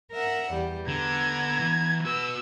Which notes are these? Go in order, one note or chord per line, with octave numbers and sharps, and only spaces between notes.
A#4 E5 F#5
E2 G3
D3 B3 A#5 G#6
E3
F#4 B4 E6